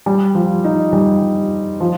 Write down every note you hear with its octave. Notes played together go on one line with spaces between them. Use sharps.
G3
F3
D#4
G3
F3